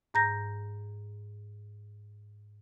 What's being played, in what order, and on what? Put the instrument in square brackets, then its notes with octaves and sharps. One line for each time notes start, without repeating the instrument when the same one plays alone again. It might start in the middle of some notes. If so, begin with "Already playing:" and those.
[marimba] G#2 A#5 G6 A#6